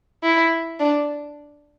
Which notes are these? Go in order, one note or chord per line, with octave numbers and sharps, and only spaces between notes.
E4
D4